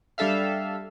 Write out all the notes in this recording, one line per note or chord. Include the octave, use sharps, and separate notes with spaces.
G3 D4 A4 E5 F5